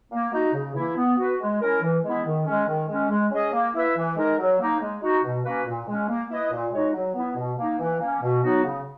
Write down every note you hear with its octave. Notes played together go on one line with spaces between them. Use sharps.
A#3
D#4 F#4
C#3
E3 A#3 E4
B3
F#4 B4
G#3
C#4 E4 A#4
E3
G#3 B3 E4
D#3
G#3 C#4
D#3
G#3 C#4
G#3
C#4 G#4 D#5
A#3
E4 B4 E5
E3
G#3 D#4 A#4
F#3
A#3 D#4
G#3
D#4 F#4
B2
A#3 C#4 F#4 B4
A#2
G#3 C#4
A#3
E4 B4 D#5
A#2
G#3 D#4 F#4 C#5
F#3
B3 E4
B2
A#3 D#4
E3
A#3 C#4
B2
F#3 B3 D#4 F#4
C#3